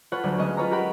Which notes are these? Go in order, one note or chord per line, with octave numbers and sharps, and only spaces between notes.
F4 A4 B4 C#5 F#5
D2 D3 F#3 G#3
G#3 A3 C#4 D#5
F4 B4 C#5 A#5
G4 A#4 F#5 B5